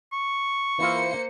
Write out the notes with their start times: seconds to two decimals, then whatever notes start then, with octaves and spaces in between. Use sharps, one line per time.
0.13 C#6
0.78 E3 A#3 E4 F4 C5 C#7